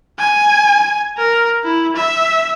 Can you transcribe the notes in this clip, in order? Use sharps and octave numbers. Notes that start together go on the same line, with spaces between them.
G#5
A#4
E4
E5